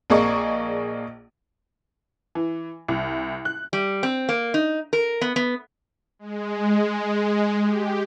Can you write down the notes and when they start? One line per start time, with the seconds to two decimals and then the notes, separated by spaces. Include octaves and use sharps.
0.10 A#1 A#3 G#4 D5 D#5 C#6
2.35 E3
2.88 C2
3.45 F#6
3.73 G3
4.03 C4
4.29 A#3
4.54 D#4
4.93 A#4
5.21 B3
5.36 B3
6.19 G#3
7.62 G4